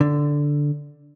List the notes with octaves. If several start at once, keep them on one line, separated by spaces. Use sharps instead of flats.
D3